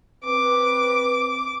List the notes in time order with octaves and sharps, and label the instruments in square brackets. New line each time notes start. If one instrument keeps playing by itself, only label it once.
[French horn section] C4 B4 [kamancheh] D6